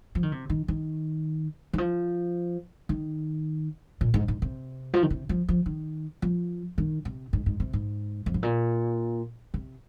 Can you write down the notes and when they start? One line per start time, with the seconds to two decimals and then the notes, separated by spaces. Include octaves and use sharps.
0.15 F3
0.23 D#3
0.32 C3
0.50 D#3
0.68 D#3
1.73 D#3
1.78 F3
2.89 D#3
4.01 A#2
4.14 G#2
4.28 G#2
4.42 C3
4.94 F3
5.02 D#3
5.10 C3
5.29 F3
5.49 F3
5.66 D#3
6.22 F3
6.78 D#3
7.05 C3
7.33 G#2
7.46 G#2
7.60 C3
7.73 G#2
8.26 F2
8.34 G#2
8.43 A#2
9.54 C3